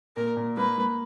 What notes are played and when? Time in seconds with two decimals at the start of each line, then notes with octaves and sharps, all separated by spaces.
0.16 A#2 A#4
0.37 A#2
0.57 A#3 B4
0.78 A#3